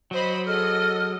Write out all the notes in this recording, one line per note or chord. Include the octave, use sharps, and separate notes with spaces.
F#3 C5 D#5 B5
G#4 A4 D#5 F6